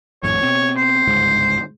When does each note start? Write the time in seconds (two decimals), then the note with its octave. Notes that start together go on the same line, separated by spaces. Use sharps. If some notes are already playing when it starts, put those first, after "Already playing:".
0.23 G#1 F2 A2 C#5
0.43 B2 C4
0.77 C5
1.07 G1 C#2 G#2